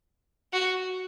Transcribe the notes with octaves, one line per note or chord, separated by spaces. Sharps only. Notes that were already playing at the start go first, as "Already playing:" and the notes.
F#4